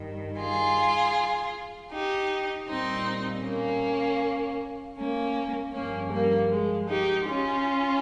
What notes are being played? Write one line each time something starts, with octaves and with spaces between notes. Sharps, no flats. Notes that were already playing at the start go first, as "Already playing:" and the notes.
Already playing: G2 D#3 G3
F4 G#4
D#4 G4
A#2 G3 C4 D#4
A#3 C#4
A#3 C#4
G2 F3 A#3 C#4
G3 A#3
G#3
D#4 G4
C#4 F4